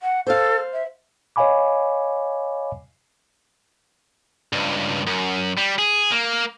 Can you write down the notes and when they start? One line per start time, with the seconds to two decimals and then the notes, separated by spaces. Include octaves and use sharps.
0.01 F#5
0.27 A4 C5 F5
0.73 E5
1.36 C#5 D#5 F5 G#5 B5 D6
4.53 C#2 G2
5.07 F#2
5.57 G3
5.79 G#4
6.12 A#3